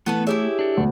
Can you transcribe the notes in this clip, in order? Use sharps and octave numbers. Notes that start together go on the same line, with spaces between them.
E3 A3 B3 A4 B4
E4 G4 G#4 C#5 E5
D4 A4
E1 D2 F#5